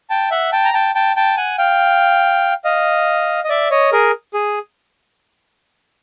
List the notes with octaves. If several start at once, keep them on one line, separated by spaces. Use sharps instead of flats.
G5 A5
E5 F#5
G5 A5
A#5
G5 A5
G5 A5
G5 A5
F#5 G#5
F5 G5
D#5 F5
D#5
D5 E5
C#5 D#5
G#4 A#4
G#4